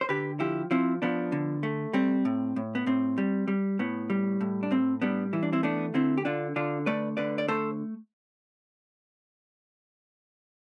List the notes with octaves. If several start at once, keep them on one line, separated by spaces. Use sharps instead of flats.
C5
D3 G4 B4
F3 E4 G4
F3 C4 E4
F3 B3 D4
D3
A3
G3 C4
A2
A2
B3
A2 C4
G3
G3
A2 B3
G3
A2
D4
A2 C4
G3 B3 D4
E3 E4
D4
C4 E4
A3 B3 D4
D3 C4 E4
G4
D3 D4 F4
D3 D4 F4
A3 B4 D5
D3 B4 D5
D5
A3 A4 C5